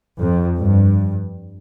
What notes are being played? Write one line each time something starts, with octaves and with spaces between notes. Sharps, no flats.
F2
G2